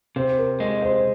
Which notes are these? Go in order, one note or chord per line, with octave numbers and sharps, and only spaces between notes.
C3 C5
A#4
G#3 D#5
C5